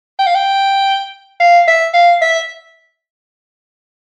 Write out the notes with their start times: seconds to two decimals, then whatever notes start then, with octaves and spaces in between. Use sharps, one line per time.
0.19 G5
0.26 F5
0.35 G5
1.40 F5
1.68 E5
1.94 F5
2.22 E5